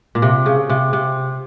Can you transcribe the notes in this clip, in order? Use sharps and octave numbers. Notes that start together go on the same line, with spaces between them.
A#2
C3
C#3
C3
C3